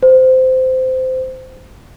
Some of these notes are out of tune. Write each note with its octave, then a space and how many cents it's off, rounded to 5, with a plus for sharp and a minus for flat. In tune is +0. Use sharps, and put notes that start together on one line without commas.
C5 -15